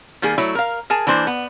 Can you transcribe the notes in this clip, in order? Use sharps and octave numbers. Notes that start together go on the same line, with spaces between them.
D#3 G3 A#3 G#4
F#3 A3 E4
A#4 F5
G#4 A#4 G#5 A5
E3 A#3 D4 C5
B3